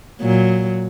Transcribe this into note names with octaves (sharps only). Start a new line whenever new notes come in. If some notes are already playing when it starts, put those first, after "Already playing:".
A#2 F#3